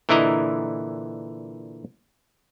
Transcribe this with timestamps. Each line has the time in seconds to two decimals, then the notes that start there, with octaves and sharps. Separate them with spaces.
0.09 A#2 D3 E3 E4 D#5 A#5